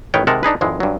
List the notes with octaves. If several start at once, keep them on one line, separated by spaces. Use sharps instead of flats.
A1 D#3 B4 C#5 G5
C3 D#3 G#3 A#4 F#5 A5
D4 D#4 G#4 B4
G#1 F2 G#2 E3 G#3
G2 F#3